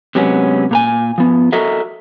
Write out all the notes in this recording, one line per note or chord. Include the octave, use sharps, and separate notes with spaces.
C3 F#3 G#3 B3 C#4
A#2 A#4 G#5
F3 B3
F#4 A4 A#4 D#5 E5